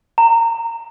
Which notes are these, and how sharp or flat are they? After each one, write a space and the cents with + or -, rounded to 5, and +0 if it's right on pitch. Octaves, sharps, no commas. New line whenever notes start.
A#5 -20